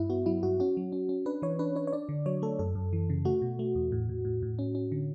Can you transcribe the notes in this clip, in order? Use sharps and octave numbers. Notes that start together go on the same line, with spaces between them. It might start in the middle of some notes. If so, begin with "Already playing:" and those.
Already playing: G2 E4
B3 F#4
F#3 E4
G2 F#4
C#4 F#4
F#3
C#4
C#4
D4 B4
E3 C#5
D4 B4
D4 C#5
C#5
D4 D5
D3
F#3 C#5
A3 A4
F#2 A4
F#2
E3
C#3
A3 F#4
B2
A3
E2
A2
A2
A2
A2
C#4
C#4
D3